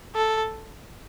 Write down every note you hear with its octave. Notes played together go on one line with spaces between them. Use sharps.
A4